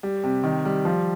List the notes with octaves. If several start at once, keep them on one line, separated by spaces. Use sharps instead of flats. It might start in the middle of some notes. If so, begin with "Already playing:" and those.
G3
C3
D#3
G3
F3